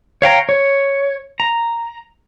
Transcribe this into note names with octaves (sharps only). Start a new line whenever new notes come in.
C#5 F5 G5 A#5
C#5
A#5